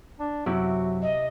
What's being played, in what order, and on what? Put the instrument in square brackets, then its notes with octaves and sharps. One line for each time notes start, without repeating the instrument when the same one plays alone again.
[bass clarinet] D4
[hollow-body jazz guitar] F#2 [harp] C3 E4 [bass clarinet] F#4
[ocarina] D#5